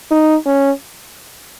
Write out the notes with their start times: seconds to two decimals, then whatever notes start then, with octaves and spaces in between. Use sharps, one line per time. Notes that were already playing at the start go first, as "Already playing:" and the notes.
0.11 D#4
0.46 C#4